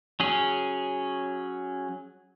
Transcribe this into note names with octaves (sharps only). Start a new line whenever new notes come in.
F#3 C#4 G#4